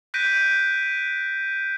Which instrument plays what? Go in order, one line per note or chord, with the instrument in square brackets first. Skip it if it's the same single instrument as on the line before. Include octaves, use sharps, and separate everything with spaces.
[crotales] F#6 G6 A#6 B6 D7 D#7